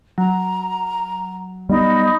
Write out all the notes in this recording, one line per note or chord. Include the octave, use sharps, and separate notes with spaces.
F#3 A#5
G3 B3 D#4 D#5 B5